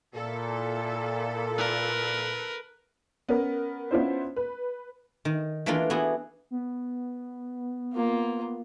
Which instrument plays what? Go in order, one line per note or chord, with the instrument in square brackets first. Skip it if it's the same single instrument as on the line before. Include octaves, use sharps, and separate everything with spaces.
[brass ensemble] A#2 [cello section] E4 A4
[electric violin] A#4 B4
[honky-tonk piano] B3 C#4 A#4
B3 C#4 D4 E4 F4 C5
B4
[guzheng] D#3
E3 A3 A#3 D4 F4
B3 E4 F#4 G#4
[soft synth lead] B3
[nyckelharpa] A#3 F4